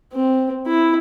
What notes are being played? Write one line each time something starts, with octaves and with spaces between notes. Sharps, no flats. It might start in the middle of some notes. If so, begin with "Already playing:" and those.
C4
E4